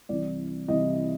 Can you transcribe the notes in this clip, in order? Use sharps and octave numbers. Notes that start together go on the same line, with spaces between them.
C2 C3 E3 D5
C2 C3 E3 D#5